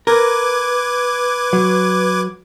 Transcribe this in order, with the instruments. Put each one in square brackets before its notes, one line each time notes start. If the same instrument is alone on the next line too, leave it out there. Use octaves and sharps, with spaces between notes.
[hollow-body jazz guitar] A#4 [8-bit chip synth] B4 D6 G#6
[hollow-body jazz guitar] F#3